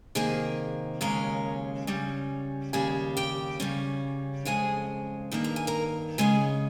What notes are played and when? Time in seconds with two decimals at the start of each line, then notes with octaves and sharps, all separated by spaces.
0.15 C3 D#3 A#3 G#4 G#5
1.01 D#2 C#3 G#3 C#4 A#4 A#5
1.87 C#3 G3 C#4
2.73 D#2 C#3 G3 G#4 G#5
3.17 G4 G5
3.60 C#3 G3 C#4
4.45 F2 C#3 G#3 G#4 G#5
5.32 G2 D#3 A#3
5.44 A#5
5.56 G#5
5.67 A#4 A#5
6.18 C#3 G#3 C#4 G#4 G#5